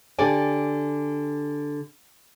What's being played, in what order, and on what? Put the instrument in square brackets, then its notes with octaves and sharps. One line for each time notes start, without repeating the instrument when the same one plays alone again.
[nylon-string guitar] D3 G4 D5 G#5